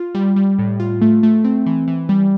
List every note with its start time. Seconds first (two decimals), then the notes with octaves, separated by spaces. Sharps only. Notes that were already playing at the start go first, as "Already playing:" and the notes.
Already playing: F4
0.15 G3
0.36 G3
0.59 A2
0.80 F4
1.01 A3
1.23 A3
1.44 C4
1.66 E3
1.88 E3
2.09 G3